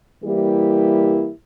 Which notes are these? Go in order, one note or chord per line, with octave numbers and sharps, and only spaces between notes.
E3 G3 A#3 E4 G4